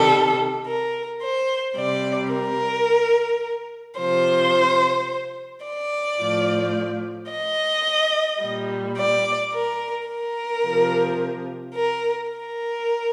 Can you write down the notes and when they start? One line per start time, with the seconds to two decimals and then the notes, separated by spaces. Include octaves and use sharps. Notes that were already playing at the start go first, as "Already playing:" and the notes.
Already playing: C3 D#3 G3 A4
0.67 A#4
1.22 C5
1.77 C3 G3 D5
2.33 A#4
3.99 C3 F3 C5
5.66 D5
6.20 A2 F3
7.32 D#5
8.42 A#2 G3
8.98 D5
9.53 A#4
10.08 A#4
10.65 C3 F3
11.74 A#4
12.31 A#4